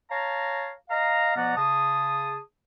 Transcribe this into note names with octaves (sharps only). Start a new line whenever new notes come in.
C#5 F5 A5 A#5
D#5 F5 A#5
B2 F3 B3 D5 F#5 A#5
C#3 G#4 A5 D#6